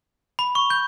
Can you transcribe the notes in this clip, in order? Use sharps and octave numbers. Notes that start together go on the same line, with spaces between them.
B5
C#6
G6